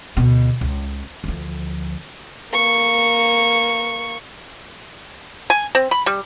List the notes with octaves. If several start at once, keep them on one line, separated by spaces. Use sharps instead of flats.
D2 B2
C#2
D2 F3
A#3 C#6
G#5
C4
B5
G3